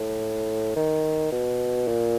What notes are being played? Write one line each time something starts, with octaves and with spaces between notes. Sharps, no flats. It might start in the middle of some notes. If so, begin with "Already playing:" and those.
Already playing: A2
D#3
B2
A#2